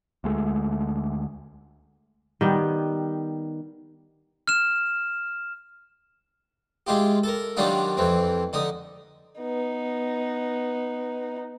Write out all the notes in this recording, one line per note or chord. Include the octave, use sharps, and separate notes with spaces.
D2 G#3 A3
D#3 G3 B3
F6 E7
G#3 E4 F4 G4
A4 A#4
D#3 F#3 G3 D4 D#4 F4
F2 E3 C4
D3 D#4 D#6
B3 D#4